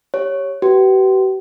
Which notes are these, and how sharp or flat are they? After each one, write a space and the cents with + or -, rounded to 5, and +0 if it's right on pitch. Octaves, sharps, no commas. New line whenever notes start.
G4 +0 C#5 +0
G4 -45 B4 +0